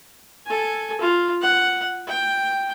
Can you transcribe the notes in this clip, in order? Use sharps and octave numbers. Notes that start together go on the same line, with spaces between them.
A4 G#5
F4
F#5
G5